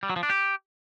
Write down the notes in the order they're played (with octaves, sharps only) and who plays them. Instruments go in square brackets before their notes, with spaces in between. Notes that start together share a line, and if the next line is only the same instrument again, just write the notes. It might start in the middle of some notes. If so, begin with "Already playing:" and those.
[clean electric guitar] G3
F#3
F3
D4
G4